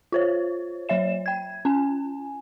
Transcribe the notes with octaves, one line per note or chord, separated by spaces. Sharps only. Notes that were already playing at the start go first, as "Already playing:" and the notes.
F4 C5 C#5
F#3 C#5 E5 E7
G5 G#6
C#4 G#5